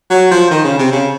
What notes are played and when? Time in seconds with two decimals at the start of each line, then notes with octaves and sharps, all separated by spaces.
0.10 F#3
0.31 F3
0.51 D#3
0.64 C#3
0.78 C3
0.92 C#3